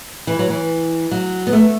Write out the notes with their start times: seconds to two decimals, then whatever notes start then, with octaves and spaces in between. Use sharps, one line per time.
0.27 E3
0.39 F#3
0.50 E3
1.11 F#3
1.47 B3
1.53 A3